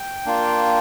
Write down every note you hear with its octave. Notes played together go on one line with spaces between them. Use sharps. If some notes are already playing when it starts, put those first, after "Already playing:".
Already playing: G5
A#3 D4 F4